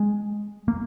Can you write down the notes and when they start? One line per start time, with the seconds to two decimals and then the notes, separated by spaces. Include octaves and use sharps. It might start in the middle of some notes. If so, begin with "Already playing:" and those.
Already playing: G#3
0.68 A#3